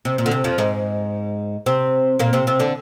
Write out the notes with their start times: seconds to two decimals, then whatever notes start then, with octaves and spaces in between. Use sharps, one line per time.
0.05 C3
0.18 A#2
0.26 D3
0.31 C3
0.44 F2 F3
0.58 G#2 G#3
1.66 C3 C4
2.19 A#2 A#3
2.33 C3 C4
2.47 C3 C4
2.60 D3 D4